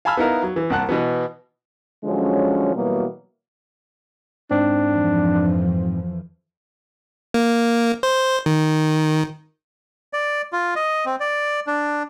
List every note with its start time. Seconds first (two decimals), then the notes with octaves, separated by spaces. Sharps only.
0.05 F5 G#5 A5 B5 E6 F6
0.17 B3 D#4 E4 A#4 F5
0.43 F#3
0.56 E3
0.70 C2 A#3 F#5 A5 F#6
0.89 B2 E3 B3
2.04 D3 F3 F#3 G#3 C#4
2.75 B2 E3 F#3 G3 A#3 B3
4.51 G#2 C4 D4
4.89 F2 E3 F3
7.34 A#3
8.03 C5
8.46 D#3
10.13 D5
10.53 F4
10.76 D#5
11.06 C4
11.20 D5
11.67 D4